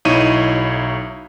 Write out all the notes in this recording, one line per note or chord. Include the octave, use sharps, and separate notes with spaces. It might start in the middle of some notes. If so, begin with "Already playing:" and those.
B1 D#4 E4 C#5 D#7